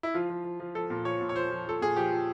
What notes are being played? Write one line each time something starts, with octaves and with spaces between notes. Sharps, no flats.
E4
F3 F4
F3
F3
F3
F3 A4
A#2
F3 C#5
A#2
C#5
F3 C5
F3
F3 A4
A#2 G#4
F3 G4
F3